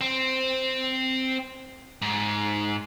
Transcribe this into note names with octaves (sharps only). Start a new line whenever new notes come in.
C4
G#2